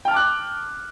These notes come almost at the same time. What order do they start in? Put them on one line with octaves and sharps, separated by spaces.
G5 F6 A5 D6 F#6